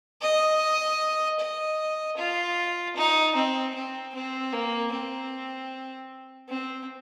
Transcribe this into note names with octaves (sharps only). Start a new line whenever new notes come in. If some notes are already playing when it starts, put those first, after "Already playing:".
D#5
D#5
F4
D#4
C4
C4
C4
A#3
C4
C4